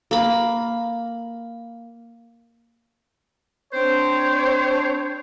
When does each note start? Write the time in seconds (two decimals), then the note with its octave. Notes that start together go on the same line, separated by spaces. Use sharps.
0.11 A#3 B5
3.73 C4 D4 C5 C#5